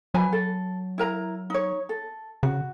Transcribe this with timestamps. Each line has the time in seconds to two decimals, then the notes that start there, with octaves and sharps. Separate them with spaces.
0.14 F#3 B4 G#5 B5
0.33 A4
0.98 E4 A#4 A#5
1.50 D#4 C#5
1.89 A4
2.43 C#3 F#4